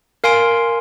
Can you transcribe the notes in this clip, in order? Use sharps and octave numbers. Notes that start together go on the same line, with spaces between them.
A#4 F5 G#5 C6 D7